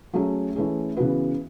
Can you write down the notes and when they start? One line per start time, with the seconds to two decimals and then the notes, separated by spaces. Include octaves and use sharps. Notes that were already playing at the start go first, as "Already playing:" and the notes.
0.13 F#3 A3 C#4 G#4
0.56 E3 A3 C#4 G#4
0.97 C#3 E3 B3 F#4 B4